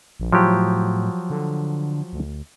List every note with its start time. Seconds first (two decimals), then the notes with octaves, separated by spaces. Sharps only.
0.20 A#1
0.32 A2 F3 F#3 G4
1.30 D3
2.13 D2